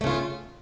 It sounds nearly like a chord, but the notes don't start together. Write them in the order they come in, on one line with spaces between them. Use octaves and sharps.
A3 C#3 F4